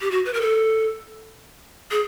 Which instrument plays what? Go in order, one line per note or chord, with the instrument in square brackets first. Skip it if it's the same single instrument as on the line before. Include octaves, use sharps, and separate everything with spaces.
[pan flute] G4
F#4
B4
A#4
A4
G#4